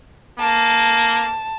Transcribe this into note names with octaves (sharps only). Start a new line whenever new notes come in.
A#3 A5